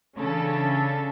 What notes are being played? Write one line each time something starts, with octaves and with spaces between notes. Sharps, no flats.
C#3 E3 C#4 D4 A4